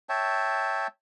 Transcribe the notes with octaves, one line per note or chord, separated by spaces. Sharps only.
C#5 E5 G5 A5